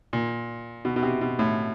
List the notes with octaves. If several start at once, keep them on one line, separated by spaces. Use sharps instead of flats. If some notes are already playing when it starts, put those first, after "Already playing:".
A#2
B2
B2
C3
B2
A2